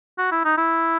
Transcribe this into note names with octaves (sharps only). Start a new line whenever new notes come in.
F#4
E4
D#4
E4